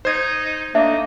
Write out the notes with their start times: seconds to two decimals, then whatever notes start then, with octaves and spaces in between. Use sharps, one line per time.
0.05 D#4 C5 G#6
0.75 A3 A#3 D4 D#4 D#5 E5